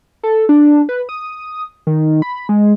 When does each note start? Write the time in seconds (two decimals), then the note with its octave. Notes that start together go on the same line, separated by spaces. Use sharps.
0.23 A4
0.49 D4
0.89 B4
1.09 D#6
1.87 D#3
2.22 B5
2.49 G#3